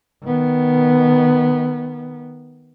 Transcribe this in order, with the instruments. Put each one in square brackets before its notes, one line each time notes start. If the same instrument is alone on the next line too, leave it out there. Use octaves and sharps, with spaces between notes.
[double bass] D#3 B3